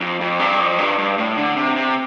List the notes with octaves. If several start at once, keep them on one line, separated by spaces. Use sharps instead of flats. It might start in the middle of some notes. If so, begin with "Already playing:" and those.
F2
F2
G2
F2
G2
G2
A2
D3
C3
C3